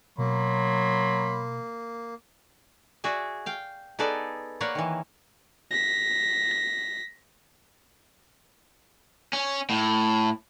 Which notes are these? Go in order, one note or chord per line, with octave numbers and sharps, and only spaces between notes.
B2 F#3 A#3 B5 C6
F#4 G#4 D5 E5
F5 G5
B3 D#4 G#4 A4 B4 D5
A#3 B4 C#5 D5 F#5
D#3 E3
A#6 B6
C#4
A2